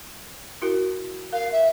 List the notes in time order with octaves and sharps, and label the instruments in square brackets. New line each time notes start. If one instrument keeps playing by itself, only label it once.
[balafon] E4 F#4 A#4
[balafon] A#4 [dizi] F5
[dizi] E5